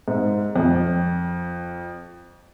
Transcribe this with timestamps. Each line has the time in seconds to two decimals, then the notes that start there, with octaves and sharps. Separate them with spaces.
0.08 G#2
0.56 F2